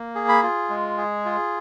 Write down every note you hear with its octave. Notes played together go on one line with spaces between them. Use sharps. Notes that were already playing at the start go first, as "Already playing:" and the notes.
Already playing: A#3
G#4
B5
F4
G#3
G#4
F4